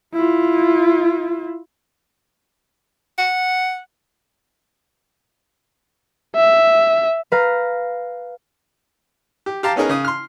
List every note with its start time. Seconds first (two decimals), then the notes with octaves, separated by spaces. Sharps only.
0.14 E4 F4
3.18 F#5
6.36 E5
7.32 B4 F5 A#5
9.46 G4
9.63 G4 F5 A5 A#5
9.76 B3 C#4 D#4 G#4 A#4
9.89 C#3 D#6
10.05 C6 F6